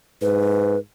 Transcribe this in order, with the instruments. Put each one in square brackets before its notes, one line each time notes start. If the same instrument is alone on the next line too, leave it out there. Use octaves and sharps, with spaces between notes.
[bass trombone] G#2 [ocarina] B4